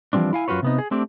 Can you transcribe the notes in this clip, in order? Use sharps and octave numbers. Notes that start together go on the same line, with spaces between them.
E3 F3 G3 C4 D4
E4 F5 G#5
F#2 F4 F#4 B4 C#5
C3 B3 D#4
G#4
A3 C4 D4 G4